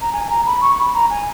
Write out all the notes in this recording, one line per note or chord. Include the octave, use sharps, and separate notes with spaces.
A#5
G#5
G#5
A#5
B5
C#6
B5
A#5
G#5